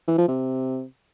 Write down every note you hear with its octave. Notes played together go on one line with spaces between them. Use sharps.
E3
F3
C3